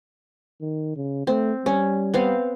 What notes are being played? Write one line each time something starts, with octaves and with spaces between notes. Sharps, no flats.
D#3
C#3
A3 C4
G3 C#4
B3 C4 F5